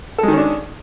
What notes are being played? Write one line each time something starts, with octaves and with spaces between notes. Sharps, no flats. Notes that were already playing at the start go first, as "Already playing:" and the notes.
D#3 G#3 C#4 D4 A4